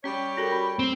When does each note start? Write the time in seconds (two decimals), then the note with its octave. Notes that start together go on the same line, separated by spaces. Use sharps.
0.04 G3 C#4 G4 C#5
0.37 C#4 F#4 A4 A#4 A#6
0.52 B5
0.79 C4